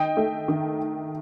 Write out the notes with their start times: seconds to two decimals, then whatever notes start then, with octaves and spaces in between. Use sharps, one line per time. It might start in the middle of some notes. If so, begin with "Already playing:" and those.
Already playing: D#3 D#5 G5
0.17 A3
0.48 D#3